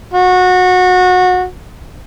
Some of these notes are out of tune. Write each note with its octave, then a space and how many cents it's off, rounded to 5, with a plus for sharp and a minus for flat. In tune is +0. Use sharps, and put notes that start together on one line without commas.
F#4 -20